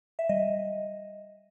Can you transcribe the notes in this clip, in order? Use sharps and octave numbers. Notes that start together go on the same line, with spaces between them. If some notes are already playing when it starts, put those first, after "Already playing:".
E5
G3 D#5